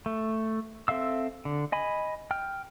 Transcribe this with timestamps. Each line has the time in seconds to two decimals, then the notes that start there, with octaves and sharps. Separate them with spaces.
0.06 A3
0.88 C4 A4 E5 F5 E6
1.45 D3
1.72 D#5 G#5 B5
2.31 G5 F6